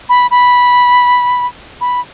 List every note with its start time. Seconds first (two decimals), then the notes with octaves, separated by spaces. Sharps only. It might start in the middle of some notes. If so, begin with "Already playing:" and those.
0.09 B5
0.31 B5
1.81 B5